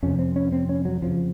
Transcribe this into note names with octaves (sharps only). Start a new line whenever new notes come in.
F2 C3 C#4
C4
C#4
C4
C#4
F#3
F2 C#3 F3